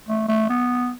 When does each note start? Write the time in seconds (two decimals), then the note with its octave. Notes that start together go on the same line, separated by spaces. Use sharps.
0.09 A3
0.28 A3
0.50 B3